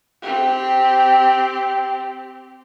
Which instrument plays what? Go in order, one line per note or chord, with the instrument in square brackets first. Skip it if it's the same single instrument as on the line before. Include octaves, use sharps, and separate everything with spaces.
[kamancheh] C4 G4